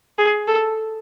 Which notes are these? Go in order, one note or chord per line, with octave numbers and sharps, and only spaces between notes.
G#4
A4